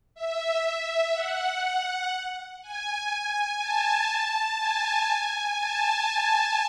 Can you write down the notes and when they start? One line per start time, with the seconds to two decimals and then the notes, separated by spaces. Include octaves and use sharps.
0.15 E5
1.13 F#5
2.62 G#5
3.60 A5
4.59 G#5
5.57 A5